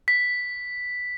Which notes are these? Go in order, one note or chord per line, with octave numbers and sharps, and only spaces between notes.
B6